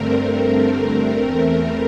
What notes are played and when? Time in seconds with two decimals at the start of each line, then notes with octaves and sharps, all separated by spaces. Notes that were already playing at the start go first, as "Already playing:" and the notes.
Already playing: G2 D3 A3 C4 A#4
0.14 A#4
1.09 E2 E3 A3 C4 A#4
1.56 A#4